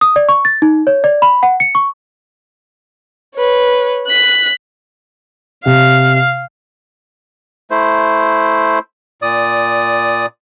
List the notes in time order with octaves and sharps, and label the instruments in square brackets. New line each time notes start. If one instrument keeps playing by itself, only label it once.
[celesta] D#6
D5
C#6
A6
D#4
C#5
D5
B5
F#5
C#7
C#6
[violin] B4 C#5
F#6 B6
[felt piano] C3 [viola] F5
[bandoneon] A3 E4 C5
A#2 D5 D#6